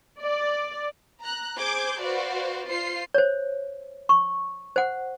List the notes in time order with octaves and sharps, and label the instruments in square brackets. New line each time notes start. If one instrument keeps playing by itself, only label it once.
[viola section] D5
[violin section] A#5 F#6
G#4 C5 D6 G6 G#6
F#4 B4 C5 D5 F5
F4 C5 C7
[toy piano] C5 C#5
C#6
C5 F#5